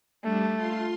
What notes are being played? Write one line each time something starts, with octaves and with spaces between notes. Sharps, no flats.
G3 A3 D4
F4 C6